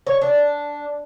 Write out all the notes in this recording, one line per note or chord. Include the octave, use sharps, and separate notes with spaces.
C#5
D4